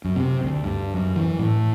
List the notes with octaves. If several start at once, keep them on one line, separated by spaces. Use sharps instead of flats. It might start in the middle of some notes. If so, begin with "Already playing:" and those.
F#2
C3
D2
G2
F#2
E3
A2